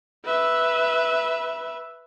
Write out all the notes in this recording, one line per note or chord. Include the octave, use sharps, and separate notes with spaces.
B4 E5